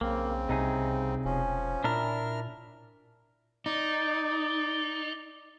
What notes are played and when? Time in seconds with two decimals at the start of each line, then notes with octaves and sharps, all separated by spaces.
0.01 B1 C#3 A#3 C4
0.49 C2 C3 D#4 G#4
1.25 E1 F3 C#4
1.84 A#2 D4 E4 A#4 F6
3.66 D#4 D5